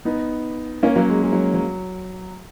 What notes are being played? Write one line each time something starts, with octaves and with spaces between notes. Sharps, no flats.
B3 D#4
A#3 C#4
F#3 A#3
G#3
G#3
F#3
F#3